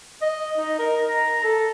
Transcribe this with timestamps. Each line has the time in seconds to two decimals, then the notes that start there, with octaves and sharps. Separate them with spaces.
0.22 D#5
0.58 D#4
0.79 A#4
1.08 A#5
1.43 A4